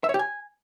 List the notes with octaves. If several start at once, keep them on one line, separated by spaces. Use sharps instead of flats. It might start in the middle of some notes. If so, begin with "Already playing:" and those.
E5
C#5
G4
G#5